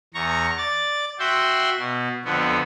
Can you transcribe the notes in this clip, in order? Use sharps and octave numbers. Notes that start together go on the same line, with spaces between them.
E2 A#5 C#6
D5 A6
F#4 E5 G5 C6
B2
F2 D3 B3